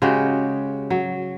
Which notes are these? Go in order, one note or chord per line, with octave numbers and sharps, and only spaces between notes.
C#3 G#3 F#4 G4
F#3